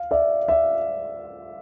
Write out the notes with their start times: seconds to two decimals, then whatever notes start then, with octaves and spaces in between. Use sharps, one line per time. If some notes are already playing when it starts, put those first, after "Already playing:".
Already playing: F5
0.11 D5 E5
0.48 D5 E5